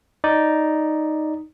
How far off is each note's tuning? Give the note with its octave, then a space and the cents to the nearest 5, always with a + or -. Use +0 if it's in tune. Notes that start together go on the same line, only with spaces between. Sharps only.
D#4 +0 D5 +0